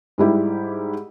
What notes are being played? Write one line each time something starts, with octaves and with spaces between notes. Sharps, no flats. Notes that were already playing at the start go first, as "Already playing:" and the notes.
G#2 G3 E4 G4